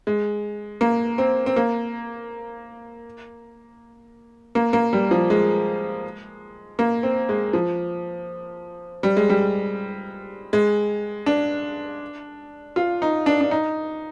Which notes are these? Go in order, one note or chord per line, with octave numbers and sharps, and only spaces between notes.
G#3
A#3
C4
C4
A#3
A#3
A#3
G3
F3
G#3
A#3
C4
G#3
F3
G3
G#3
G3
G#3
D4
F4
D#4
D4
D4
D#4